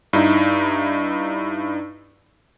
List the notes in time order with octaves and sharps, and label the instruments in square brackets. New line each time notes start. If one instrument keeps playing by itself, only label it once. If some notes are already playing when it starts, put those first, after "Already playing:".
[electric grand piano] G2 D#4 E4